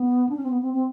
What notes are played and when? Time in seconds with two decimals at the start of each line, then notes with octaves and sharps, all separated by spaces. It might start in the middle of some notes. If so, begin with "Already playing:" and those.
Already playing: B3
0.29 D4
0.36 C#4
0.43 C4
0.50 B3
0.62 C4
0.74 C4